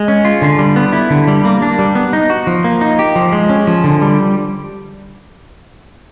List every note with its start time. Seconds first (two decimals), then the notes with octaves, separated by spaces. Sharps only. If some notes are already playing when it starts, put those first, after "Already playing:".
Already playing: G#3
0.08 C#4
0.25 F4
0.42 D3
0.58 G3
0.76 B3
0.93 E4
1.10 D3
1.27 G3
1.45 A#3
1.62 D4
1.79 G3
1.95 B3
2.13 D#4
2.30 F#4
2.47 F3
2.64 A#3
2.81 D#4
2.99 G4
3.16 F3
3.32 G#3
3.49 C#4
3.67 F3
3.84 D3
4.02 G3